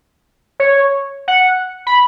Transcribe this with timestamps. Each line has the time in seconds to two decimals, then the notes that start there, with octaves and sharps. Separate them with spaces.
0.60 C#5
1.28 F#5
1.87 B5